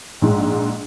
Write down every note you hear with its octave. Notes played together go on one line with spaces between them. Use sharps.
A#1 G#2